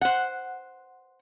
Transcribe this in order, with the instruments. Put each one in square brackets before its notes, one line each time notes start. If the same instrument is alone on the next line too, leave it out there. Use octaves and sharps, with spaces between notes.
[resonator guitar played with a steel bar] C5 F#5